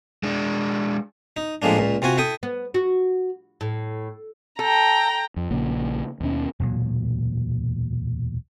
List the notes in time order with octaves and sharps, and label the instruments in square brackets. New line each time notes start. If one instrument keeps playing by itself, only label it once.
[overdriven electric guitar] G#3 D4
[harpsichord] D#4
A2 F3 G#3 A#3 D4
C#2 A#2
C3 F4 F#4 G#5
E4 A4 G5 D#6
[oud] B3
F#4
A2
[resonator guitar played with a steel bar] A4 [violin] G5 A#5
[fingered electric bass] F2
A#1 C#3 A#3
D#2 B2 C#4
[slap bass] E1 D2 A#2 F#3